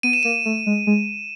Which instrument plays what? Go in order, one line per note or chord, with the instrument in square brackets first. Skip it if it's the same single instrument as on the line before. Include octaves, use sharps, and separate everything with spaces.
[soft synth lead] B3 [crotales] D#7
[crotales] E7
[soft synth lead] A#3 [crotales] D#7
[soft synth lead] A3
G#3
G#3